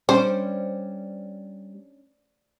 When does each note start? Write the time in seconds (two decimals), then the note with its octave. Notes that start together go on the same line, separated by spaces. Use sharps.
0.09 G3 C#4 D4 C5